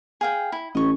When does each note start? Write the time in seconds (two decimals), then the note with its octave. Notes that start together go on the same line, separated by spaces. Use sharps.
0.21 G#4 F5 G5
0.52 E4
0.75 A1 D#5 C#6